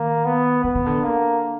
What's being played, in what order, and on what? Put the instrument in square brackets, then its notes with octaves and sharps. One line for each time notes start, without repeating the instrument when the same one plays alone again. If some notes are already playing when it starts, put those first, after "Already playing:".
Already playing: [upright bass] D#3 [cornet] A#3
[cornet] B3
[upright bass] D3 [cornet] B3
[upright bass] C#3
D3
[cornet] A#3